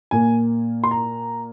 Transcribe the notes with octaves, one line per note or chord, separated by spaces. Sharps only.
A#2 A#3 G#5
C6
A#5